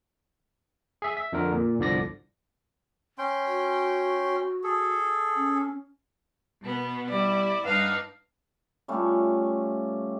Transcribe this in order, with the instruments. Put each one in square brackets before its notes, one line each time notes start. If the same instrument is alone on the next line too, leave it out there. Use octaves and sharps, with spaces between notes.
[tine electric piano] G#4 E5
E5
F2 D3 A#4
A#2
G1 C2 D3 F3 D5 A#6
[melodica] C#4 G5 C6
[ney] F#4
[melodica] G#4 A4
[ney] C#4
[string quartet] B2 B3
[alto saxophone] G3 [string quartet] E4 [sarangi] D5
[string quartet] G2 D4 D#4 [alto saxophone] B4 [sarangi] F5
[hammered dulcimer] G3 A3 C#4 F4